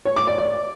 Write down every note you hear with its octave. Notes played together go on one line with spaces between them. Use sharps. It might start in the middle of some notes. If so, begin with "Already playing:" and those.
C#5
D6
D5
D5